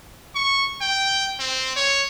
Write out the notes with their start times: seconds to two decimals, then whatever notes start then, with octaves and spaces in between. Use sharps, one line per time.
0.35 C#6
0.81 G5
1.40 C4
1.76 C#5